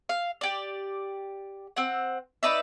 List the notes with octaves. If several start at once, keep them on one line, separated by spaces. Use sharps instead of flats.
F5
G4 D5
C4 F#5
D#4 B4 D5 E5